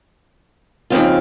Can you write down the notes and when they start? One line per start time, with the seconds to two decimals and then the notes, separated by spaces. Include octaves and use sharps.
0.90 D#2 C#3 F3 C4 F4